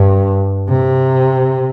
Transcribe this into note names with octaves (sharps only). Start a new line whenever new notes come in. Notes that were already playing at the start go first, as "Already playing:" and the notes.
Already playing: G2
C3